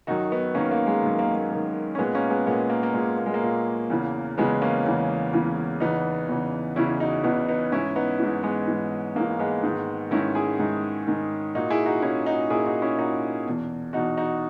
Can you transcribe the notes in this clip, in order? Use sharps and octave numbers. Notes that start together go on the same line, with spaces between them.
F#2 D#3 D#4 F#4
B3 D#4
F#2 D#3 A#3 C#4
A#3
G#3
F#2 D#3
A#3
A#3
F#2 D#3
C#4
A#2 G#3 B3
A#3 C#4
G#3 B3
A#2 G#3 B3
A#3
A#3
A#2 G#3
A#3
G#3
A#3
A#2
E2 C#3 E3
E2 C#3 E3 G#3 B3
A#3 C#4
E2 C#3 E3
E2 C#3 E3
E2 C#3 E3 B3 D#4
E2 C#3 E3
E2 C#3 E3 C#4 E4
D#4 F#4
E2 C#3 E3 B3 D#4
B3 D#4
G#2 E3 C#4 E4
B3 D#4
G#2 E3
G#3 B3
G#2 E3
G#2 E3 A#3
G#3 B3
G#2 D#3
G#2 D#3 C#4 E4
E4 G#4
G#2 D#3
G#2 D#3
A#2 D#4 F#4
E4 G#4
D#4 F#4
A#2 C#4 E4
D#4 F#4
A#2 E4 G#4
D#4 F#4
C#4 E4
A#2 D#4 F#4
E2 B2
E2 B2 D#4 F#4
D#4 F#4